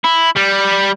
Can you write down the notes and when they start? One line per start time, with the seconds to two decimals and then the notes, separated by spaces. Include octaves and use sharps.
0.04 E4
0.36 G3